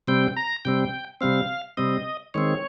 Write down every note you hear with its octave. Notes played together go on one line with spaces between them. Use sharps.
C3 G3 C4 G5
A#5
C3 G3 C4 G5
C3 G3 C4 F5
C3 G3 C4 D#5
D#3 G#3 C4 C#5